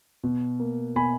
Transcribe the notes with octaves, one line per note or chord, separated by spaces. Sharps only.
B2
A#3
B2 G#5 B5